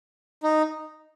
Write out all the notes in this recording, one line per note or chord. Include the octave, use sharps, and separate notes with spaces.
D#4